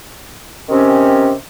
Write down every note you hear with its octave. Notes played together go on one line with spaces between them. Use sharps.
C3 D#3 C4 C#4